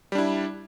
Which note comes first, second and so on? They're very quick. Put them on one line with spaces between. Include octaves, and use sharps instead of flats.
G3 D4 E4